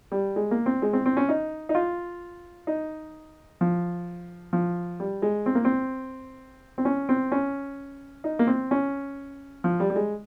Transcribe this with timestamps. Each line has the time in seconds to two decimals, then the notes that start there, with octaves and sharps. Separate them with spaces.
0.12 G3
0.36 G#3
0.51 A#3
0.66 C4
0.82 G#3
0.93 C4
1.06 C4
1.17 C#4
1.29 D#4
1.69 D#4
1.75 F4
2.67 D#4
3.61 F3
4.53 F3
5.00 G3
5.22 G#3
5.46 C4
5.55 A#3
5.65 C4
6.78 C4
6.85 C#4
7.09 C4
7.32 C#4
8.24 D#4
8.39 A#3
8.47 C4
8.71 C#4
9.64 F3
9.80 G3
9.90 G3
9.96 G#3